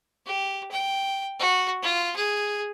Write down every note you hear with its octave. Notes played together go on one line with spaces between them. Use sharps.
G4
G5
F#4
F4
G#4